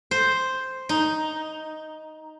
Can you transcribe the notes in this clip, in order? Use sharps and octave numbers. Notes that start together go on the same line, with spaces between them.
C5
D#4